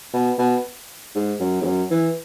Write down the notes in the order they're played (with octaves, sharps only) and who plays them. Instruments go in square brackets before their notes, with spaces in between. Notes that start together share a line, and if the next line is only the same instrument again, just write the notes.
[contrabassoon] B2
B2
G#2
F#2
E2
F#2
E3